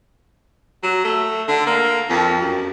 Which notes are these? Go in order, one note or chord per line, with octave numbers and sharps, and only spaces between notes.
F#3
A3
D3
A#3
F2
F#2